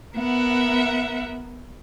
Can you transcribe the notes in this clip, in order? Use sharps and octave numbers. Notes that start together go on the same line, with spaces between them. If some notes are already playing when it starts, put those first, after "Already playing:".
B3 A#4 E5 F#5